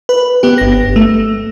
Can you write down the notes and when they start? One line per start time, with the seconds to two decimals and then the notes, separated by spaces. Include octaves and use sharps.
0.09 B4
0.43 B3 G4
0.58 G1 A#6
0.96 A3